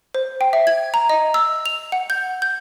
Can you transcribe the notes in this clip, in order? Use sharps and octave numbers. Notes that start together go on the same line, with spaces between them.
C5
G5
E5
G#6
A#5
D#5
E6
F7
F#5
G6
G6